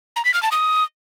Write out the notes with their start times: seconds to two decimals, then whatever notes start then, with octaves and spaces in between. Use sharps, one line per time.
0.16 A#5
0.25 B6
0.34 F6
0.43 A5
0.52 D#6